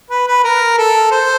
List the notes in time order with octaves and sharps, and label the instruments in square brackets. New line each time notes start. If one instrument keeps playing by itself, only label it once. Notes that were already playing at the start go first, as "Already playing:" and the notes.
[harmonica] B4
B4
A#4
A4
C5